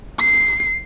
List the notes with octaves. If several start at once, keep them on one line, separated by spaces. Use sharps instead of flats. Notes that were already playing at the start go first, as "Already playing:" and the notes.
C7